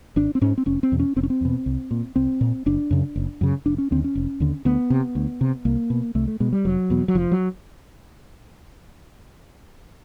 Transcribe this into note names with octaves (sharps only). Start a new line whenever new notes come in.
G#1 D4
C4
G#2 C#4
C4
F1 C#4
C4
E2 B2
C#4
F1 C4
C#4
C4
E2 B2
C2
A#2
C2 C4
A#2
F#1 D4
F#2 C#3
F#1
F#2 C#3
F1 D4
C#4
D#2 D3 C4
C#4
F1
D#2 D3
D2 B3
C3
D2
C3
C2 A#3
B2
C2 A3
A3
B2 G#3
G3
F1 F#3
E2 B2
F#3
F1 F3
F#3